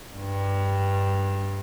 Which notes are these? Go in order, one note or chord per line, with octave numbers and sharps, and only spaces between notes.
G2